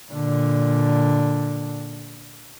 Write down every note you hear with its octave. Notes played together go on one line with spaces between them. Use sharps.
A#2 D3